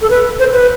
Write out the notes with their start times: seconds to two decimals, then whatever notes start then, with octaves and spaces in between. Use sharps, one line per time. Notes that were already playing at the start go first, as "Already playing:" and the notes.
0.02 A4
0.10 B4
0.39 C5
0.53 B4